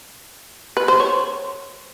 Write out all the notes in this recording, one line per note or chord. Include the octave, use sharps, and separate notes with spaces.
B4
C5
C#5